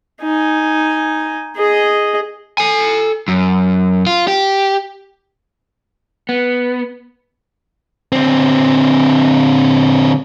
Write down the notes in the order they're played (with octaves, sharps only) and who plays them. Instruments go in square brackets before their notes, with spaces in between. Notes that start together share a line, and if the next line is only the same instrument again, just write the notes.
[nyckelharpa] D#4 G#5
G#4 D#5
[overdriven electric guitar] A4 G#5
F#2
F4
G4
[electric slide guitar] B3
[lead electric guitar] D3 C4